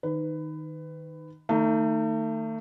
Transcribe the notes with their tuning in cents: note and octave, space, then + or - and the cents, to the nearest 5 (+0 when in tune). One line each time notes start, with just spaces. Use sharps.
D#3 +0 B4 +20
D#3 +0 A3 +35 D#4 +0